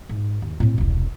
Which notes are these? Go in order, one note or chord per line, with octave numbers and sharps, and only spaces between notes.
G#2
D#2
A2 C4
E1 C2